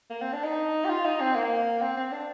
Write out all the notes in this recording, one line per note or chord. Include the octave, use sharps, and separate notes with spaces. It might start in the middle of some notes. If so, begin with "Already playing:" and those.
A#3
C4
D4
D#4
G4
F4
D#4
C4
A#3
C4
C4
D4